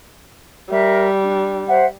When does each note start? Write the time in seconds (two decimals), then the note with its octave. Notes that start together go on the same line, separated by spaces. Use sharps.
0.70 G3 A#4 E5
1.22 D4
1.67 C5 E5 F#5